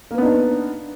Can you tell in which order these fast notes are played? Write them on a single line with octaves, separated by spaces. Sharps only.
A#3 B4 B3 D#4 D4